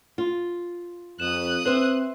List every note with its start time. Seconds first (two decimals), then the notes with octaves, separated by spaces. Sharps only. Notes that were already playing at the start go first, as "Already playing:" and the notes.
0.18 F4
1.20 F2 D#6 F#6 E7
1.65 C4 B4 C5 E5